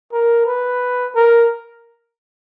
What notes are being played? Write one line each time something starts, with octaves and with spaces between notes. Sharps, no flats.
A#4
B4
A#4